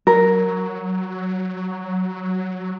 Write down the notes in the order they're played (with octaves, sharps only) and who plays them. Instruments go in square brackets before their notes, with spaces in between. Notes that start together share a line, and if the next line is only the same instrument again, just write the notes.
[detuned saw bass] F#3 [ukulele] A#4